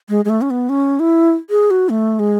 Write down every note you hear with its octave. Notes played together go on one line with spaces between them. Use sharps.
G#3
G#3
A3
C#4
B3
C#4
E4
G#4
F#4
A3
G#3